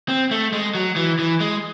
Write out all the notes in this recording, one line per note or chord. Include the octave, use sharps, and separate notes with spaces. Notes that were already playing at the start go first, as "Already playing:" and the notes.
C4
A3
G#3
F#3
E3
E3
G#3